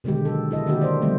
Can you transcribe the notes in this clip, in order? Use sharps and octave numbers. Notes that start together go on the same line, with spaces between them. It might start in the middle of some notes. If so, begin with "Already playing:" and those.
B2 D3 D#3 G#3 G4
F#3 A4
E4 A4 D#5
D3 D#3 A#3 D#4 F#4 G4
C5 D5
D3 E3 F3 G3 A3 B3